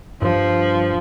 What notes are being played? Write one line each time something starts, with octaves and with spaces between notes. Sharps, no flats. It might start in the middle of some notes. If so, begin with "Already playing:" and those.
G2 F3